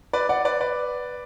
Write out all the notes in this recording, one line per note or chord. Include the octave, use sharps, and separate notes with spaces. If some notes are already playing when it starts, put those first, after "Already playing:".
B4 D5
D5 F#5
B4 D5
B4 D5